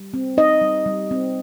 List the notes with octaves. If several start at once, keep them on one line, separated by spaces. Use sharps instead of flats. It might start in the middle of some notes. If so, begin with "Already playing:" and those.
Already playing: G3
C4
D#4 D#5
G3
G3
C4